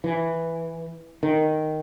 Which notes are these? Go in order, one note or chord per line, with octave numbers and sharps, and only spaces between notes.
E3
D#3